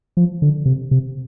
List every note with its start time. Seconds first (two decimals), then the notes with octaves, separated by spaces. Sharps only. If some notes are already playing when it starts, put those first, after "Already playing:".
0.17 F3
0.42 D3
0.66 C3
0.91 C3